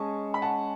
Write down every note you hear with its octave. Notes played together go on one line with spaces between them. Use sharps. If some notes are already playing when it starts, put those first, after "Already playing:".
Already playing: G#3 C#4 G#4 A5 C#6
B5
F#5 A5